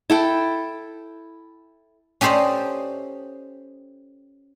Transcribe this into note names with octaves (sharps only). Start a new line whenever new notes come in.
E4 A4 G5
C#4 G4 A4 C5 D5 D#5